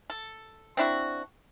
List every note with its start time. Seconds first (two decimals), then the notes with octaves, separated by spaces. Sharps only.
0.10 A4
0.77 C4 D4 E4 F#4